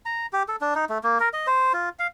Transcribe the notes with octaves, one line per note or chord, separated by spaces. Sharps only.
A#5
G4
A4
D4
D#4
A3
A#3
A#4
D#5
C5
F4
F5